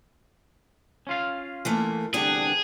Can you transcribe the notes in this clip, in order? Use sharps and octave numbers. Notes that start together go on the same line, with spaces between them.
C#4 F4 F5
E3 A3 A#3
C2 D3 B3 D4 G4 G#4